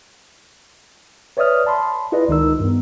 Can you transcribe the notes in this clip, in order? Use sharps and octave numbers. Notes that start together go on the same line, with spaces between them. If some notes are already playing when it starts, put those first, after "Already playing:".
B4 C#5 D5 E5 D#6 F6
A5 B5 C6
E4 F4 G#4 B4 D5 D#5
C#2 D#3 D#4 A#4 E6
G2 B3